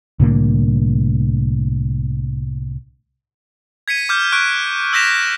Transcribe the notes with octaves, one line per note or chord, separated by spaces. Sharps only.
C2 A2 D3 A#3
G#6 B6 C#7 D#7
D6 F6 G6
C#6 F#6 D7 D#7
E6 G6 A#6 B6 E7 F7